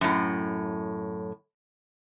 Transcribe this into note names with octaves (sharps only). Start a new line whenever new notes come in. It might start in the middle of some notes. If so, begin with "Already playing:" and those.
F#2 A2